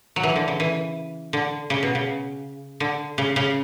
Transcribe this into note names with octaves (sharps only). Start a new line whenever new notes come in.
F#3
E3
D3
C#3
E3
D3
C#3
B2
C#3
D3
C#3
C#3